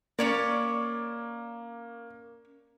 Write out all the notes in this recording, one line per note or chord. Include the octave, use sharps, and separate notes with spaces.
A#3 C#4 C#5 D5